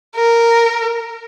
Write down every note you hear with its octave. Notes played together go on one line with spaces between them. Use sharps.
A#4